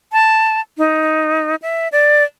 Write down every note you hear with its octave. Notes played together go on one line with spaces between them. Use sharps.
A5
D#4
E5
D5